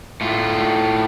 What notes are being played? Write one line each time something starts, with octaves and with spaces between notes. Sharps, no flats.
A2 F4